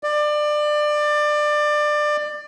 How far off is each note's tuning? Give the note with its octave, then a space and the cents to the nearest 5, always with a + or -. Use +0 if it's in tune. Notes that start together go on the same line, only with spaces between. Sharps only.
D5 +25